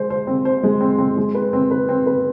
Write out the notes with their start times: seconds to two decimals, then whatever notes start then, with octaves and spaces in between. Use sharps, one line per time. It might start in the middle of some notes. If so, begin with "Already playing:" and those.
Already playing: G#3 C5
0.10 C5
0.27 C4
0.45 C5
0.63 G#3
0.81 C4
0.98 C4
1.17 G#3
1.35 B4
1.53 C4
1.71 B4
1.89 C4
2.07 B4